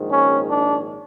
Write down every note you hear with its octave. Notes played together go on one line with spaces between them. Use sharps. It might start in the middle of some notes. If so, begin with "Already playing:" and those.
Already playing: A#1 G#2 D#3
C#4
D4